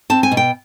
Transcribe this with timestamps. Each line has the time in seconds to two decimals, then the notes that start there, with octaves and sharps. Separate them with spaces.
0.10 C4 A5
0.23 G#5
0.32 B2
0.37 G5